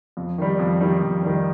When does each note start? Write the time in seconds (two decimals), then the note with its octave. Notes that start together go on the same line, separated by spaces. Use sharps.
0.17 F2
0.38 D#3 G3
0.59 F2
0.81 D#3 G3
1.02 F2
1.23 D#3 G3